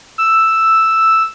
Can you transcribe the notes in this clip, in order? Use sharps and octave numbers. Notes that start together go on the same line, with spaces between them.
E6